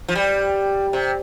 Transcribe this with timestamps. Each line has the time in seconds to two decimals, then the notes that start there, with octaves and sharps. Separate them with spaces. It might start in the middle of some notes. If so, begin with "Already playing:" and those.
0.09 F3
0.15 G3
0.93 C3